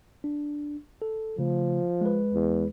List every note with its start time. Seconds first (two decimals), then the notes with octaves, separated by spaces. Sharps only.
0.24 D4
1.02 A4
1.39 C#3 F3 A3
2.01 G#3 B4
2.34 E2